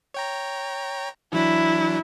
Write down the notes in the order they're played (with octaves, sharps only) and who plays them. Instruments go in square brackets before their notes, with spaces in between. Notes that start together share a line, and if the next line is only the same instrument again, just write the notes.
[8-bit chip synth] C#5 G5 A#5
[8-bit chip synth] E3 F#3 D4 [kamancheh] E4